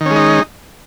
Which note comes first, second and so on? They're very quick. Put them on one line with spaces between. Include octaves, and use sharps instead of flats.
D#3 C#4 G#3 D#4